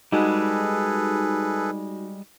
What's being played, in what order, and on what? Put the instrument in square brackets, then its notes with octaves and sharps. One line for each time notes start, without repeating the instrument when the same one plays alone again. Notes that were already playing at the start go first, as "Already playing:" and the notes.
[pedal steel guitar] G3 G#3 [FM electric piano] D#4 F#4 [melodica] G#4 A4 B4